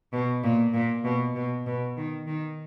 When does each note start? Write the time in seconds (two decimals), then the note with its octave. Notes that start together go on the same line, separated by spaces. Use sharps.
0.13 B2
0.44 A#2
0.74 A#2
1.05 B2
1.35 B2
1.66 B2
1.97 D#3
2.27 D#3